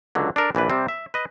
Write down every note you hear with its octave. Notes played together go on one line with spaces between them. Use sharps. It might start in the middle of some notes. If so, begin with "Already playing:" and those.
C#2 D3 F#3
D4 A4 A#4
A#1 E3 D4 B4
C3 G3 C4
E5
B4 D#5